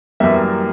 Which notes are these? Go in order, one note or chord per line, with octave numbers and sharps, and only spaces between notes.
F#2 E3 G3 A#3 E5